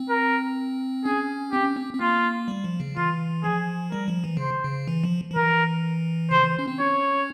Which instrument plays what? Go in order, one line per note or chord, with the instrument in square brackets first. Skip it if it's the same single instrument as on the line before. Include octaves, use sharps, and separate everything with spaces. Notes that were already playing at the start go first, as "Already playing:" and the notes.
Already playing: [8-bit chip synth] C4
[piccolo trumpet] A#4
[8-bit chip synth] C#4 [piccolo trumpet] G#4
[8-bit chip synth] C4 [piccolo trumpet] G4
[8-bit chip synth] C#4
C4
C4
[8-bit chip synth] A#3 [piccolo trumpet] F4
[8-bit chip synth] G3
F3
C#3
[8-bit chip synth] E3 [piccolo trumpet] F4
[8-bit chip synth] F3 [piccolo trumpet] G#4
[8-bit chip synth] G3 [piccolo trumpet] A#4
[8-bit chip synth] F3
E3
[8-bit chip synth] C#3 [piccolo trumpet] C5
[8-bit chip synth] C#3
E3
F3
F3
[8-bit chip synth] E3 [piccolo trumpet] A#4
[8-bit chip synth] C#3 [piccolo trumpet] C5
[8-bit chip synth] E3
C#4
C4
[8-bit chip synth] C#4 [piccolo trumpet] C#5